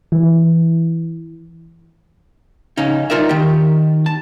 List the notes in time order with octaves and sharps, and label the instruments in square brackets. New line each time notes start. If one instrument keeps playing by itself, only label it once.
[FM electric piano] E3
[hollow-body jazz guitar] C#3 C#4 D#4
D#4 F4 A#4 D5 E5
D#3 G4
A5